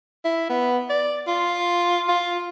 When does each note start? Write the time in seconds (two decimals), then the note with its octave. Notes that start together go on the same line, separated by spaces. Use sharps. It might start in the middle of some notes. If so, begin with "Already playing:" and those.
0.25 E4
0.49 B3
0.89 D5
1.27 F4
2.08 F4